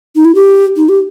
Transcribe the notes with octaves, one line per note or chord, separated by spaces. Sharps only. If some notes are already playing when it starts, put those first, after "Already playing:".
D#4
E4
G4
D#4
G4